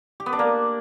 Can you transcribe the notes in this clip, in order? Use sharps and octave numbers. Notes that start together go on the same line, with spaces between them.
G4
B3
D4
A#3